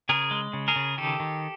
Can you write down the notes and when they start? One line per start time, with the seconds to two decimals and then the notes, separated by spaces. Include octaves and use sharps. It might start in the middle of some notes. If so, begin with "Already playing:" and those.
0.09 C#3 G#4 A#4
0.31 G#3
0.53 C#3
0.68 G#4 A#4
0.76 C#3
0.98 D#3 G4 A4
1.20 D#3